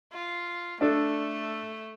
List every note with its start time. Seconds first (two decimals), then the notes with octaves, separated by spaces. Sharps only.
0.13 F4
0.81 A3 D4 A4